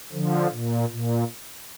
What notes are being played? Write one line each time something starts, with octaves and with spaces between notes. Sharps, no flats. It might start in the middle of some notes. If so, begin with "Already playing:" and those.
D3 F3
A#2
A#2